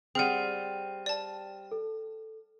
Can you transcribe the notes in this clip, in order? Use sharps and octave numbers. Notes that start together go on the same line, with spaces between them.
G3 C4 G#4 F#5 G5 F6 D#7
D5 A5
A4